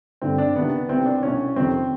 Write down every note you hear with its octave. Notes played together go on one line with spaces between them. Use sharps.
G2 D3 C4
D4
C#2 C3 D#3 B3
C2 C3 D#3 C4
D4
C2 B2 C#4
F2 C3 D#3 C4